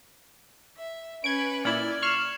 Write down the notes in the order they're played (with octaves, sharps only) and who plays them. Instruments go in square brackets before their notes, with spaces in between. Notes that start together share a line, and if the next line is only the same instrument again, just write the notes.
[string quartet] E5
[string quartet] C#4 B4 [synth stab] G#6 D7
[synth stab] A#2 E4 [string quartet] D5 [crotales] F6 G#6 F#7
[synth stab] C#6 F6 [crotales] C7 E7